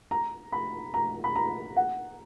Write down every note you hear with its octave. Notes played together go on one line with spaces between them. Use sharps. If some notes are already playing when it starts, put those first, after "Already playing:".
A#5
B5
A#5
B5
A#5
F#5